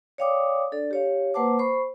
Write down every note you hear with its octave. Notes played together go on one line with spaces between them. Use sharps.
C#5 D5 F5 G5 D6 D#6
D4 A4 D5
G4 C#5 F5
A#3 B4 C5 F#5 A5 D6
C5 B5 C#6